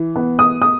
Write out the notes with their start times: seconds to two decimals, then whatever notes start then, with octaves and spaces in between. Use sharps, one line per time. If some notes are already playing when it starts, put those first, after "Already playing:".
Already playing: E3
0.16 B3
0.39 D#6
0.62 D#6